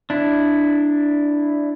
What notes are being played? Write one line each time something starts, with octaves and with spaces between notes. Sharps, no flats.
D4 E4